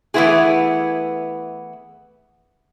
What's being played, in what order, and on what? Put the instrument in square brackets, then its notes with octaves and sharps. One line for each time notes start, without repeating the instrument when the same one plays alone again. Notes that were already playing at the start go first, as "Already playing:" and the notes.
[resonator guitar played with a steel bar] E3 A3 B3 C4 E4 G#4